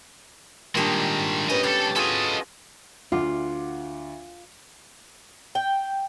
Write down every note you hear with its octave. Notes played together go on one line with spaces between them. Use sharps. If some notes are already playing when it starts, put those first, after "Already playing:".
A#2 D#3 G3 G#3 D4
G#2 G3 B3 C#4 D#5
C#2 G4 A4
F4 F#4 G#4 A4 D#5
D2 F4 F#5 D6
G5